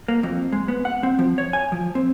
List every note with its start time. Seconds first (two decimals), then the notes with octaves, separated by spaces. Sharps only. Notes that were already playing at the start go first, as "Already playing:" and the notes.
0.08 A#3
0.23 F2
0.52 G#3
0.68 B3
0.85 F#5
1.03 C4
1.19 F3
1.38 C#5
1.53 G#5
1.72 F3
1.95 C4